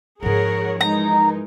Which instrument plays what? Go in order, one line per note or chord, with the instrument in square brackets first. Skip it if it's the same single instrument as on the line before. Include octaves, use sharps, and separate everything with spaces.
[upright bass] G#2 F3 [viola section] G#4 C#5 F#5 [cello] A#4
[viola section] E3 D#4 A#4 [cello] G#3 [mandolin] A#5